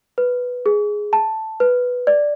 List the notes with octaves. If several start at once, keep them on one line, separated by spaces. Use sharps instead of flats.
B4
G#4
A5
B4
D5